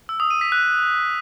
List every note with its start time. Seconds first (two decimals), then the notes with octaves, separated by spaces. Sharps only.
0.09 E6
0.20 D#6
0.31 D#7
0.41 B6
0.52 F#6